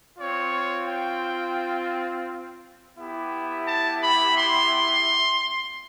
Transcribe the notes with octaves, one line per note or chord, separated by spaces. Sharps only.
C4 F4 C#5
G5
B3 E4 G4
A5
B5
C6